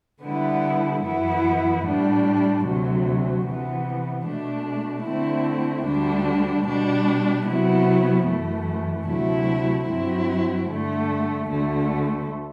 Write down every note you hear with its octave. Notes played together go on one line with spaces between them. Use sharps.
D3 G3 B3 E4
F#2 E3 B3 E4
A2 G3 D4
D2 C3 F#3
C3 E3 B3
B2 A3 D4
D3 A3 C4 E4
D2 D3 G3 D4
B2 G3 D4
C3 F#3 B3 E4
F#2 E3 A3
D2 C3 F#3 A3 E4
G2 F#3 C4 E4
G2 D3 A3
D2 D3 A3